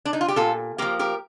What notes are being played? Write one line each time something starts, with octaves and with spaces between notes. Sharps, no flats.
D4
D#4
F4
G4
A#2 F4 A4
F3 A#3 G4 A#4
G4 A#4